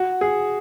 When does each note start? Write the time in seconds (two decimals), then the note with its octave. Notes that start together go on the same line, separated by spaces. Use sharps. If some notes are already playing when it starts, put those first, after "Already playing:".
Already playing: F#4
0.21 G#4